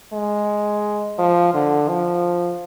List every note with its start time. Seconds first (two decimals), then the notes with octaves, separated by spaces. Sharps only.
0.13 G#3
1.19 F3
1.54 D3
1.89 F3